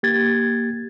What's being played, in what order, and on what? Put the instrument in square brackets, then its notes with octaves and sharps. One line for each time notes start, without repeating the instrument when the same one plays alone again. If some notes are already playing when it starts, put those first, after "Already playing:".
[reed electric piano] A#3 G4 G#6 A6